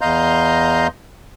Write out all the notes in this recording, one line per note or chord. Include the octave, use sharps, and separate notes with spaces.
E2 D#5 F5 A#5 C6 G6